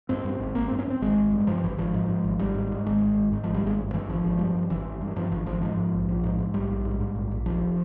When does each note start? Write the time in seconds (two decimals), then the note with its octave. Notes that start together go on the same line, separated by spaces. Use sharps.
0.09 G2 C4
0.25 G2
0.32 C4
0.40 G#1
0.55 G#1 A#3
0.68 G2 C4
0.79 C#4
0.87 G2
0.90 C4
1.02 G#1 G#3
1.17 G#1
1.33 G2
1.47 G2 F3
1.64 G#1 E3
1.78 G#1 F3
1.94 G#2
2.09 G#2
2.24 G#1
2.39 G#1 G3
2.55 G#2
2.71 G#2
2.86 G#1 G#3
3.01 G#1
3.17 G#2
3.32 G#2
3.43 G#1 F3
3.54 G3
3.62 G#1 G#3
3.79 G2
3.93 G2 E3
4.08 G#1 F3
4.24 G#1
4.39 G2
4.54 G2
4.70 G#1 E3
4.85 G#1
5.01 G2
5.16 G2 F3
5.31 G#1 F3
5.46 G#1 F3
5.62 G#2 F3
5.77 G#2
5.93 A#1
6.09 A#1
6.24 G#2
6.39 G#2
6.54 A#1 G3
6.70 A#1
6.85 G#2
7.00 G#2
7.15 A#1
7.31 A#1
7.46 F1 F3